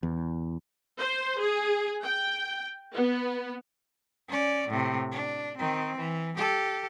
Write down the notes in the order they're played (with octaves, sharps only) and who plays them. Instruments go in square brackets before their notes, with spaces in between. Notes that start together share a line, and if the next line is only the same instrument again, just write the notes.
[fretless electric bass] E2
[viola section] C5
G#4
G5
B3
[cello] C#4 D5
A2 C3
D4
D#3 C4
E3
G4 A4